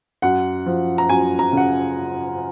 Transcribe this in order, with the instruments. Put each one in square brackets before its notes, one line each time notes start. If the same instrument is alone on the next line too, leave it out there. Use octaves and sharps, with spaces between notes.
[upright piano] F#2 F#5
F3
A#5
F#2 G#5
A#5
C#3 F#5